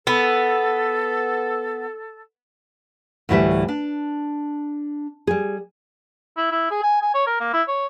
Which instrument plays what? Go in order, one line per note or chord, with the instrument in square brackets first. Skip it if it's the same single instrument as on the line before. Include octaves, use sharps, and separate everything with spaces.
[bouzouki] B3 [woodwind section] A4
[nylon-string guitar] D2 A2 E3 G3 E5
D4
G3 G#4
[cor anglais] E4
E4
G#4
G#5
G#5
C#5
A#4
A#3
E4
C#5